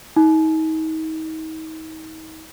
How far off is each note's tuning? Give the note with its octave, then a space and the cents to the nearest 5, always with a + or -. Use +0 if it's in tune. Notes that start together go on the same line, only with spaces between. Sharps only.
D#4 +35